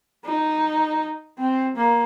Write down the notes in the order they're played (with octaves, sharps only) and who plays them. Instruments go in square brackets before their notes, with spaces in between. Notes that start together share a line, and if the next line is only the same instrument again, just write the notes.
[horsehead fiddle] D#4
C4
A#3